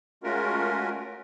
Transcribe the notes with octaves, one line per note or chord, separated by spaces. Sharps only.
G#3 A3 C#4 F4 F#4 A#4